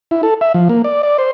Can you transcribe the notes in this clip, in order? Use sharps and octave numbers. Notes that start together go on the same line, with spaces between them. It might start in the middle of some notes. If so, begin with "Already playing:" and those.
E4
A4
E5
F3
A#3
D5
D5
C5